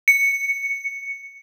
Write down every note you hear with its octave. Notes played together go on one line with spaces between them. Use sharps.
C#7